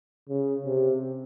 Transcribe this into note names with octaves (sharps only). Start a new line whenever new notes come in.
C#3
C3